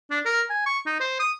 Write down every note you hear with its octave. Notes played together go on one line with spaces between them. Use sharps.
D4
A#4
G#5
C#6
D#4
C5
D#6